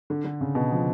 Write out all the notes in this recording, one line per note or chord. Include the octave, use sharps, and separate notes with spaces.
D3
D3
C#3
B2
F3